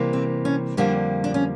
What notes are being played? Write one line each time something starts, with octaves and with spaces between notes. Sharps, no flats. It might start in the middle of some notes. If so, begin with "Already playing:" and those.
Already playing: C3 E3 G3 A#3
C4
C#4
F2 D3 G3 A#3 D4
D4
C#4